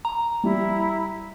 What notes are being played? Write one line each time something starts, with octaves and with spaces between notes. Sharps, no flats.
A#5
G3 E4